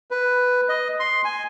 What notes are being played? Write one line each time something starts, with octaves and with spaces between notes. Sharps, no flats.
B4
D#5
C6
G#5